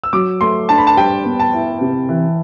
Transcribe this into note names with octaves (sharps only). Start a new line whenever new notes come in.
E6
F#3 D6
A3 C6
D4 A5
B5
A5
G3 G5
B3
A5
E4
C3
E3